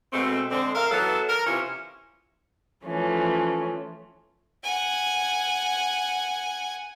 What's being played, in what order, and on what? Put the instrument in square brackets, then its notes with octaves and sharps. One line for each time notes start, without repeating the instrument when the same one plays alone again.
[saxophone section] B2 G#3 A3 C4
D3 G#3 C4
A#4 E5 F5
E3 F#3 B3 A4
A#4
C3 E3 C#4 E4 F4
[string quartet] E3 F3 A3 C#4
[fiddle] F#5 G#5